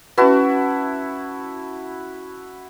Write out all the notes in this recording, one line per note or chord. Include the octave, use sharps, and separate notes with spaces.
C#4 E4 F#4 B4 A5